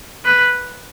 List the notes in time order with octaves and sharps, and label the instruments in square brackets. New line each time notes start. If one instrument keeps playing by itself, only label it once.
[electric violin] B4